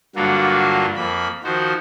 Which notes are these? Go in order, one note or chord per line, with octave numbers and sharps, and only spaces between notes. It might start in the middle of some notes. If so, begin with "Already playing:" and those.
G2 D3 F#3 A#3 F4 F#4
F2 A#3 B5
D#3 F3 F#4 C5